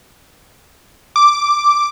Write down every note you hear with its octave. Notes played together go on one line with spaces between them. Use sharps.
D6